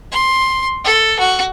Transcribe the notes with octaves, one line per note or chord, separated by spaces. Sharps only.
C6
A4
F#4